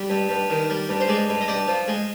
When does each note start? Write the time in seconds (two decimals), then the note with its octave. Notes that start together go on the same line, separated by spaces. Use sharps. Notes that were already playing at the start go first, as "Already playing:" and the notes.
Already playing: G3
0.10 G2
0.29 G2
0.50 D#3
0.70 G3
0.89 G2
1.00 C5
1.08 G#3 D5
1.29 G2
1.41 D#5
1.48 G2 D5
1.68 F3
1.88 G#3